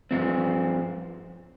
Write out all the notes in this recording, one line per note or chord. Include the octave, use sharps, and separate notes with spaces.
G2 F3 C4